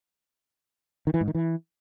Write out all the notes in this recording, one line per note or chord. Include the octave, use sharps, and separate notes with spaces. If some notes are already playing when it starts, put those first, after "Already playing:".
D#3
E3
G#2
D#3
E3